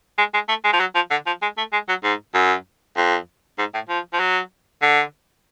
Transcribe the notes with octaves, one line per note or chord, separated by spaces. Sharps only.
G#3
G#3
A3
G#3
F3
F#3
F3
D3
F3
G#3
A3
G#3
F#3
G#2
F#2
F2
G#2
A2
F3
F3
F#3
D3